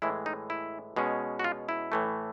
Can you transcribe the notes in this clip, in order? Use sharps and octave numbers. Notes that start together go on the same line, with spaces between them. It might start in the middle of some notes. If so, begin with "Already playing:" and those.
A2 E3 G#3 E4
D#4
E4
B2 G#3 C#4
F#4
F4
E4
A2 E3 A3